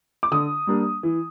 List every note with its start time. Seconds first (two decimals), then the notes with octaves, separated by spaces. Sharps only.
0.23 D6
0.31 D3 D#6
0.67 G3 A#3 D4
1.03 E3